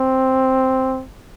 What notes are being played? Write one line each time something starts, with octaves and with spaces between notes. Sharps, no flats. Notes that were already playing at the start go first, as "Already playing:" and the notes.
Already playing: C4